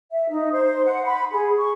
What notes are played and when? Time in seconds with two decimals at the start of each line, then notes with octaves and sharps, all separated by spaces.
0.12 E5
0.30 D#4
0.52 C5
0.86 F#5
1.05 B5
1.32 G#4
1.57 C#6